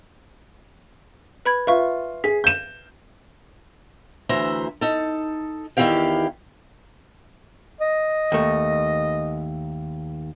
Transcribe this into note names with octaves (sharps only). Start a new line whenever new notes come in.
B4 B5 G#6
F4 B4 E5 C#6
G#4 B6
G6 E7
D2 E3 C5 E5 A#5
D#4 A4
E2 D#3 E4 G4 F5 G5
D#5
D#2 A3